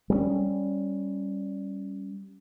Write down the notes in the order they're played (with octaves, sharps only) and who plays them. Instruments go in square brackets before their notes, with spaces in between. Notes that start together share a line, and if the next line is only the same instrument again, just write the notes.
[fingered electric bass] G3 C4 C#4